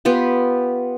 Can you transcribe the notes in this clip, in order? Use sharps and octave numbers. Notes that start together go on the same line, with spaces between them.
B3 F4 G4